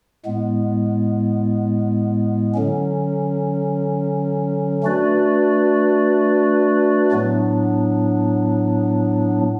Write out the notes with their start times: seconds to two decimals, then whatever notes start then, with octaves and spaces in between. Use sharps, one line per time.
0.25 A2 G#3 B3
2.54 D3 F#3 C#4
4.83 A3 D4 F#4 B4 D5
7.12 A2 F#3 B3 D4